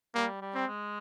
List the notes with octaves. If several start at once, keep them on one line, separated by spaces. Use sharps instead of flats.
G3 A#3
G3
C4
G#3